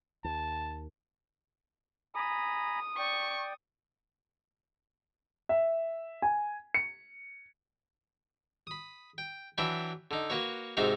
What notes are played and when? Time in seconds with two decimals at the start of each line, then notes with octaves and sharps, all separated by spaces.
0.24 D#2 A5
2.16 G#5 A#5 B5 D#6
2.98 D5 G5 C#6
5.49 E5
6.22 G#5
6.74 C#7
8.67 B5 D#6
9.18 G5
9.58 E3 F#3 D4 E5 G5 B5
10.11 D3 D#4
10.30 A#3 F#4 B4 C#5
10.77 G#2 C3 D#4 F#4 E5 F5